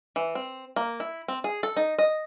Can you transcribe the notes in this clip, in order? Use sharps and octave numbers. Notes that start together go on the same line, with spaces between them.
E3
C4
A#3
E4
C4
G#4
A4
D#4
D#5